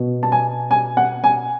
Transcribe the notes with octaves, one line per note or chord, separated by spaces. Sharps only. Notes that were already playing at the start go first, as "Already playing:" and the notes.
Already playing: B2
A5
G#5
G#5
F#5
G#5